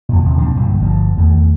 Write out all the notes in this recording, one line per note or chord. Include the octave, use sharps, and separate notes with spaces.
F2 A#2
D#2 C3 E3
A#2 F3 C4 D4
B1 G2 A#2 D3
G1 G2 F3
E2 D#3 A3